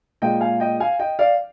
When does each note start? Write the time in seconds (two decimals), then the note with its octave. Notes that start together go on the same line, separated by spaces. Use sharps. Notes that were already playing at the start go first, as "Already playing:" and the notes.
0.22 A#2 G#3 D#5 G5
0.41 F5 G#5
0.60 D#5 G5
0.80 F5 G#5
0.99 D#5 G5
1.19 D5 F5